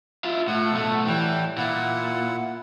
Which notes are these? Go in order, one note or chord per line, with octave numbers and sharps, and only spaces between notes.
E4 F4
A2 F#5
B1 A3
A2 E3 G3 G5
A#2 E4 F#5